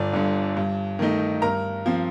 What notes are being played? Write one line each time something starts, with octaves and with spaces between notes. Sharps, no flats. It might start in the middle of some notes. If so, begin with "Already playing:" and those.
Already playing: G1 D5
G2 D3
G2
D#3 A3 D#4
G2 A#4 A#5
F3 C4